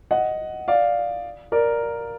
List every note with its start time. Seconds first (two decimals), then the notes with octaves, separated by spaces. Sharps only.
0.11 D#5 F#5
0.68 D5 F5
1.52 A#4 D5